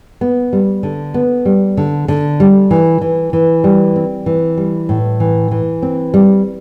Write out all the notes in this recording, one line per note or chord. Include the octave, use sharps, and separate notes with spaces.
B3
G3
D3
B3
G3
D3
D3
G3
E3
E3
E3
G3
C4
E3
G3
A2
E3
E3
C4
G3